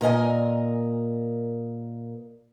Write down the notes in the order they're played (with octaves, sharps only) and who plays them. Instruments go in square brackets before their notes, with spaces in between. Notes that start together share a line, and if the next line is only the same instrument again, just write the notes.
[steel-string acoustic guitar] A#2 A#4 D#5 G#5